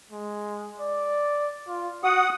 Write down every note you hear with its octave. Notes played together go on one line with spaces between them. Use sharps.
G#3
D5
F4
F#4 F#5 D#6